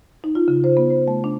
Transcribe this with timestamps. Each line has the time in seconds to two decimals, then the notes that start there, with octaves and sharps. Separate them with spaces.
0.24 D#4
0.35 F4
0.48 C#3
0.64 C5
0.77 B3
0.90 C5
1.08 A3
1.24 D4